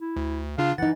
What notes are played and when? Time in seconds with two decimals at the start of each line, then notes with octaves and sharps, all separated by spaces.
0.01 E4
0.16 D2
0.58 C#3 D4 F4 F5
0.78 E3 D#4 F#5 A6